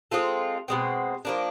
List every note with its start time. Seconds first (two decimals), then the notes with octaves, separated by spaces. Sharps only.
0.11 G#3 C4 F4 A4
0.68 B2 G#3 C4
1.25 F3 A#3 D4